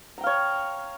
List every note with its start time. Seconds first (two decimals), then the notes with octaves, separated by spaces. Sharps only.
0.18 A#5
0.21 G5
0.24 F5
0.27 C#5